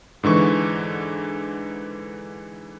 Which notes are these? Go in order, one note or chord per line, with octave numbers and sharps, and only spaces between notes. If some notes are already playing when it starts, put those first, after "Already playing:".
G#2 D3 E3 C#6